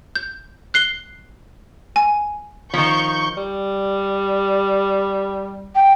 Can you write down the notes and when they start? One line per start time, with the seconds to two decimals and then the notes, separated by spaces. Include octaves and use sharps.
0.15 G6
0.74 F#6 C7 G7
1.96 G#5
2.74 D#3 F3 C#6 G6
3.37 G3
5.75 G5